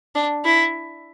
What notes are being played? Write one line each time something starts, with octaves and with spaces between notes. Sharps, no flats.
D4
E4